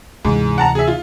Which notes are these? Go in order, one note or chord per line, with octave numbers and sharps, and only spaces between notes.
D2 G#2 C3 E3
F#5 A5 A#5
G#4 E5
F4